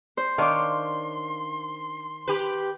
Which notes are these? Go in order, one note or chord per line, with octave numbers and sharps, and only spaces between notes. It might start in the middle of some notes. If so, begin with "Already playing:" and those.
C5
D#3 D4 C#5 F5 C6 D6
G4 B4